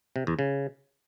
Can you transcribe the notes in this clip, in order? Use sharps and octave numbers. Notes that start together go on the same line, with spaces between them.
C3
E2
C#3